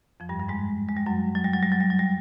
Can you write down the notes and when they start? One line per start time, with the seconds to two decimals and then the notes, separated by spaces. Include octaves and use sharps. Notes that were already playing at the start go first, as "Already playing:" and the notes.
0.20 F2 F3
0.29 G2 G3
0.39 G2 G3
0.48 G#2 G#3
0.88 G#3
0.97 G3
1.06 F#2 F#3
1.35 F#3
1.44 G3
1.53 F#3
1.63 G3
1.72 F#3
1.80 G3
1.90 F#3
1.99 G3